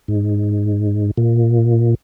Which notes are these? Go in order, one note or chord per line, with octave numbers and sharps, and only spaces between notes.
G#2
A#2